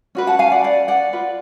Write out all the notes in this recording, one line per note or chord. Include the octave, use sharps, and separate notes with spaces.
C#4 F#4 B4
F#5 A5
F5 G#5
D5 F#5
D5 F#5
D5 F#5
F4 B4